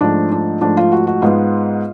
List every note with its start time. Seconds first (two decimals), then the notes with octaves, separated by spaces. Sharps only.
0.01 G#2 F3 A3 D4
0.32 D4
0.61 G#2 F3 A3 D4
0.77 F4
0.92 F#4
1.07 F#4
1.22 G#2 G#3 B3 F4